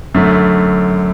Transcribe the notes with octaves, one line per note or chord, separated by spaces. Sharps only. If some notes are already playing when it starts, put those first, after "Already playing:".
F#2 D3 A3